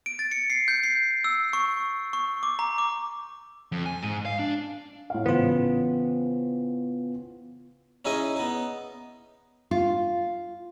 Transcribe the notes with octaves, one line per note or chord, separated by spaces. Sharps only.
D7
A6
C#7
C7
G6
C7
E6
C#6
C#6
D6
A#5
D6
F2
G#5
G#2
F5
D4
A2 F5
A1 C#3 B3 F4 C5
C#4 D#4 E4 G#4 D#5 G#5
B3 D#4
F4